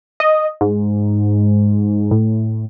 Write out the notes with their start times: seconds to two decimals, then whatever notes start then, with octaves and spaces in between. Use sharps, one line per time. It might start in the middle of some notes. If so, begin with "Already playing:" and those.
0.20 D#5
0.61 G#2
2.11 A2